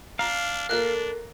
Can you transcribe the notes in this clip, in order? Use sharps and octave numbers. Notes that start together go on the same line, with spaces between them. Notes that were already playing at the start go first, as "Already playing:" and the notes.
D4 F5 A#5
A#3 D4 A4 A#4 F#6